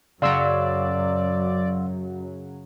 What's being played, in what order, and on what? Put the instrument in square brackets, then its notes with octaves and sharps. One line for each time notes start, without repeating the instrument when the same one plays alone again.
[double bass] F#2 [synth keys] C#3 F#3 [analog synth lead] D5 [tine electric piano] F5 C6 E6